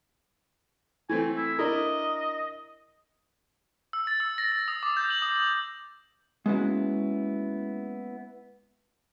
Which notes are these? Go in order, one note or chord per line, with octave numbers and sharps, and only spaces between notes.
E3 A3 C4 G#5
E4
D4 E4 A#4 D#5
E6
A6
E6
A#6
A6
D#6
D6
G6
F#7
D#6
F#7
G#3 A#3 B3 C#4 E4 F#4